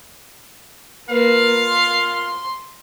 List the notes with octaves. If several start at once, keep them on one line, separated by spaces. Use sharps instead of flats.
A#3 F4 A#4 B4 F5
C6